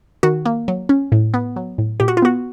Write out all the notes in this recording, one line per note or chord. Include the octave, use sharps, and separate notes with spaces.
D#3 F#4
A#3
F#3
C#4
A2
B3
F#3
A2
A#2 G4
F#4
F4
B3 F#4